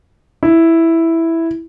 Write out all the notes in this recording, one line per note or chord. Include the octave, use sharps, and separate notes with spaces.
E4